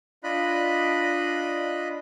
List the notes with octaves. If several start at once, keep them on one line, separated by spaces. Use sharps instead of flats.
D4 F4 D#5 B5 F#6